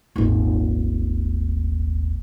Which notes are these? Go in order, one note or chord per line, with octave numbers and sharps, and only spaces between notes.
D#1 G#1